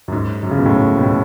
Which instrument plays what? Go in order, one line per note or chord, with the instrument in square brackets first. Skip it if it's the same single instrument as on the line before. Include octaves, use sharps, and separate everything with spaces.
[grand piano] F#2
G#2
F#2
C#3
B2
A2
G#2
B2
A2